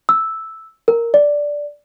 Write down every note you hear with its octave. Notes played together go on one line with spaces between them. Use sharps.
E6
A#4
D5